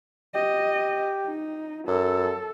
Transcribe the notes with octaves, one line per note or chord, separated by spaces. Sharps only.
G4 D#5
D#4
F#2 A4